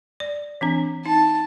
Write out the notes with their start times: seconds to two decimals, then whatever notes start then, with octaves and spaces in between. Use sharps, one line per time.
0.20 D5
0.61 E3 C4 D4
1.06 D#4 A5